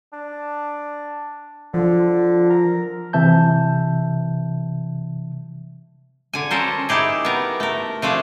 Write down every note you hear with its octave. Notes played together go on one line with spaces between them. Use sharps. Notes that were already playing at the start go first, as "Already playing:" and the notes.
D4
D3 F3 F4
A#4
C3 E3 E5 A5 G6
D3 G#5
C#4 A4 A#4 C5
D#4 E4 G4 G#4
B3 A#4
A3 A#4
F3 A3 D4 G#4